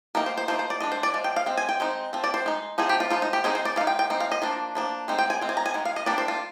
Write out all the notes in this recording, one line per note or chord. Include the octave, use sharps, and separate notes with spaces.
D#3 A#3 D#4 A#4
C5
C5
F3 A#3 D#4 C5
C5
D5
G#3 D4 D#5
C5
D5
F3 G#3
G5
F5
G#3 C4
G#5
G5
G#3 C4 D#4
F3 C4
D5
C5
G#3 D#4
F3 C4 D#4 G#4
G4
F4
F3 G#3 D#4 F4
D#4
G4
G#3 C4 D#4 G#4
C5
D5
G#3 D#4 F5
G5
G5
G#3 C4 D#4
F5
D#5
F3 A#3 D4
F3 A#3 D4
G#3 C4 D#4
G5
G#5
G#3 C4
G#5
A#5
G#5
D#3 G#3
F5
D#5
G3 A#3 D4 D5
C5
F4